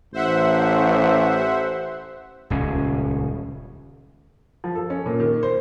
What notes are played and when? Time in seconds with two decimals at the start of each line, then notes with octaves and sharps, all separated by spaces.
0.13 A1 C5 E5 F#5
2.50 D#1 C#2 C#4
4.64 F3
4.75 A4
4.90 C#4
5.06 A#2
5.20 D#3
5.43 C5